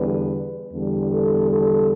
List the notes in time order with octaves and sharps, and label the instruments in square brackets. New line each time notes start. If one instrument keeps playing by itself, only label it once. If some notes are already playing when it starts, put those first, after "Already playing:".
Already playing: [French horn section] E2 D3 G3 B4
E2 D3 G3
A4
A4